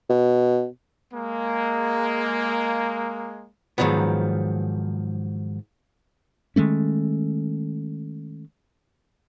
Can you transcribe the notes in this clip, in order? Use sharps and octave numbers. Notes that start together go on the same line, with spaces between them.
B2
G#3 A#3
G#2 D#3 F3 F#3 B3
D#3 G#3 A3 C#4